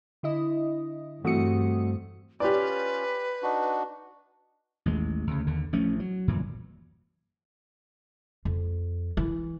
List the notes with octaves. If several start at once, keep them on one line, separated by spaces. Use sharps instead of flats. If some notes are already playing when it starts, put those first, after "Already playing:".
D3 E4 D#5
G2 E3 A3 C4 F#4 D#6 C#7
C#4 F4 G4 B4 D5
D4 D#4 F#4
A1 D#2 G#3
D2 C#3
D#2 D3
A1 F3 A3 C#4
F#3
G1 F#2 A#2 E3
F2
E3